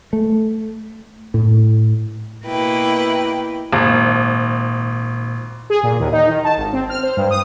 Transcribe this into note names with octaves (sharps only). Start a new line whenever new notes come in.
A3
A2
B2 A#3 E4 B4 G5
G#1 A#2
G#4
A#2
D#2
D#4
D#3
A5
G#1
C4
F6
C5
G2
D#6